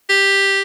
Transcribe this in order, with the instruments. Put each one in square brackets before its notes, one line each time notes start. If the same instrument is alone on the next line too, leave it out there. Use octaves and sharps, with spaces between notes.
[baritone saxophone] G4